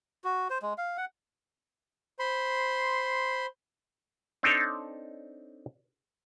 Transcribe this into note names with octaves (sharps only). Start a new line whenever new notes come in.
F#4
C5
G#3
F5
F#5
C5 B5 C6
C4 D4 D#4 A4 C#5